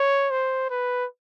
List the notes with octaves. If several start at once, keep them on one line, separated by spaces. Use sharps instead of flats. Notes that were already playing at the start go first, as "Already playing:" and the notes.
Already playing: C#5
C5
B4